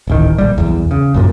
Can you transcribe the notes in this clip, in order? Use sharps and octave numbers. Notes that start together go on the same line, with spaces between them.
D1 A1 D#3
A#1 G3
B1 E2
C#3
A#1 F#2 A#2